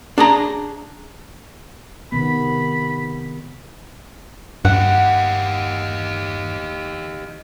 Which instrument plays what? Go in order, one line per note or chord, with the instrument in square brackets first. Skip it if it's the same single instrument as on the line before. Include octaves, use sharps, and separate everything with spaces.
[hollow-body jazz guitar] D4 G#4 A#5
[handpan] C3 D#3 B3 [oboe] B5
[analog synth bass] G2 [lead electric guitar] D#4 G4 [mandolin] F#5